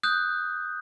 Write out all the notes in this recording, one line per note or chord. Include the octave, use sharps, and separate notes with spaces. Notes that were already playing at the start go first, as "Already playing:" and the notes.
D#6 F#6 G6